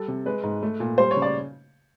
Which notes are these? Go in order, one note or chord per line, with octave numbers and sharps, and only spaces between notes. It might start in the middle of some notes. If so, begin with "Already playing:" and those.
Already playing: G3 A4
C3
G#3 B4
G#2
A3
A#2
G3 C5
C#5
C#3
D5